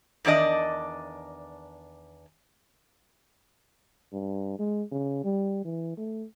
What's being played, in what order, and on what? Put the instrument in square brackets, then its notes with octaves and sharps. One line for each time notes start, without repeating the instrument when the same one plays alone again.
[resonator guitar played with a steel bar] E2 D#3 D4 D5 D#5
[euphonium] G2
G#3
C#3
G3
E3
A3